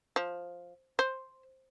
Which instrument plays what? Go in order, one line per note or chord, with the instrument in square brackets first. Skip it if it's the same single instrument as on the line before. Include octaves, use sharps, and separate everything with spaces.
[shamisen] F3
C5